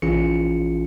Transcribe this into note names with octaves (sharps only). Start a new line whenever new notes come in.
A#1 E3 C#4 F4 G#4 C#7